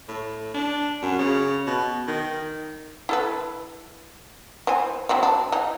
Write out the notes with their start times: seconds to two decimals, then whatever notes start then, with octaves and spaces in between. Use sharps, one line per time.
0.08 A2
0.54 D4
1.02 F#2
1.19 C#3
1.67 B2
2.07 D#3
3.09 E4 A4 B4
4.67 E3 C5 G#5
5.09 F#3 C4 E4
5.23 D4
5.52 E3 D#4